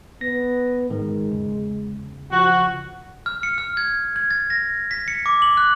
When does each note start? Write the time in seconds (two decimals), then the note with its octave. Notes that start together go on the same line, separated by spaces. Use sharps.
0.21 B3 A#6
0.90 G#2 D#3 G#3
1.31 E2 C#3
2.31 F3 F#4
3.26 F6
3.43 C#7
3.58 F6
3.77 G#6
4.16 G#6
4.31 A6
4.50 A#6
4.91 B6
5.08 C#7
5.26 D6
5.42 F#7
5.57 F#6